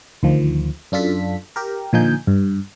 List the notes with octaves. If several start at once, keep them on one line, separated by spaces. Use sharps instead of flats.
D2 D#3 F3
F#2 D4 F4 A4 B6
G4 A#4
A#2 D3 F3 D#4 G#5 G6
G2